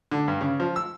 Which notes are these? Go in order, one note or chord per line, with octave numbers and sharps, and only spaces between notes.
D3
G2
C#3
F3
E6